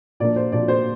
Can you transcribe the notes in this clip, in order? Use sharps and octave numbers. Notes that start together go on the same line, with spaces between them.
A#2 F3 A#3 D4 D5
C5
A#2 F3 A#3 D4 D5
C5